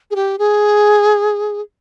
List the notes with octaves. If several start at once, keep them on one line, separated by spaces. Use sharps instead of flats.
G#4
G4
G#4